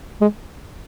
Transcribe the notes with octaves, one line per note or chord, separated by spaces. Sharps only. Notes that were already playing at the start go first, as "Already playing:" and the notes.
G#3